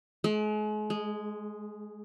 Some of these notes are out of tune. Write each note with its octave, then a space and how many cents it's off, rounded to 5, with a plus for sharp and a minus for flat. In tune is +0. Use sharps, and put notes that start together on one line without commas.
G#3 +40
G#3 -5